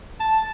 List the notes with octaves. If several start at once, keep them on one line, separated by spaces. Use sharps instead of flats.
A5